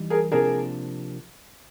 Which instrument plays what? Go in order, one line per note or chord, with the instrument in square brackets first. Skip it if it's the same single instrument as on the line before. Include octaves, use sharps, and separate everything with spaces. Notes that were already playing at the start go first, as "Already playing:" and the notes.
Already playing: [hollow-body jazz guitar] E3 G3 D#4
[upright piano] G#4 A#4
[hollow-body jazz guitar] C3 F3 A#3 D4 [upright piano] G#4 A#4